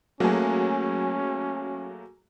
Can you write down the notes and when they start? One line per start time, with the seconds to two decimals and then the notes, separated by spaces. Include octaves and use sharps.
0.20 F#3 A3 A#3 C#4 G#4